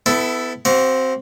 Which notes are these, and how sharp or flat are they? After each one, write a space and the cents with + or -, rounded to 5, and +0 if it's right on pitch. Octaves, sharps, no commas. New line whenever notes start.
B3 +30 E4 +0 A4 +0
C4 +0 F#4 +35 F5 +40